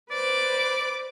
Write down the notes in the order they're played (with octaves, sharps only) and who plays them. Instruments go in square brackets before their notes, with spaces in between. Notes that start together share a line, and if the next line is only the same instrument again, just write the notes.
[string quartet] B4 C5 D6 [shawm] D5